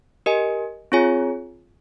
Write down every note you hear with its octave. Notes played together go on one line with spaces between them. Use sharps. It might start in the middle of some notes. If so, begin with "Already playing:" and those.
G4 A#4 D#5 G#5
C4 F4 G#4 C#5 G#5